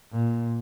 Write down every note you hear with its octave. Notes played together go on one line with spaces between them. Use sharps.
A#2